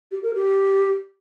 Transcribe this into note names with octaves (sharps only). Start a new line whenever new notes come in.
G4
A#4
G4